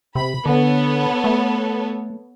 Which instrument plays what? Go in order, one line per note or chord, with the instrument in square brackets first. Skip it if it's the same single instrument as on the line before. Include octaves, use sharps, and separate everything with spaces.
[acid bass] C3 [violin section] B5
[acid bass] D3 [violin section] B3 A4 C#5
[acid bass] A3